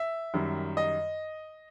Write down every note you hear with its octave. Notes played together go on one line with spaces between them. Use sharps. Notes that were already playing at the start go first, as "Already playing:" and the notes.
Already playing: E5
F#2 D#3 G3
D#5